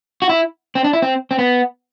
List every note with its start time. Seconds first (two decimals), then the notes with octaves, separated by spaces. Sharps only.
0.22 F#4
0.29 E4
0.75 C4
0.84 D4
0.93 E4
1.02 C4
1.31 C4
1.39 B3